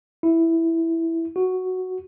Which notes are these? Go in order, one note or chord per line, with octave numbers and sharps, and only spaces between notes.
E4
F#4